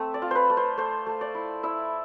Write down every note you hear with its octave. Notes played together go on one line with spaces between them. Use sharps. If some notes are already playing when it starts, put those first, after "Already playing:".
Already playing: A3 C4 E5
D5
F4
B4 C5
A3
C5
A3 C5
A3
D5
E4
E4 E5